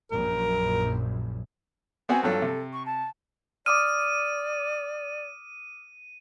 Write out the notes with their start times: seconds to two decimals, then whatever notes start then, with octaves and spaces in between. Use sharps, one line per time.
0.11 A#1 F#2 A#4
2.09 B3 C4 F#4 G#5
2.23 G2 F3 F#3 A4
2.42 C3
2.73 C#6
2.85 A5
3.66 D5 D6 D#6 F6 D#7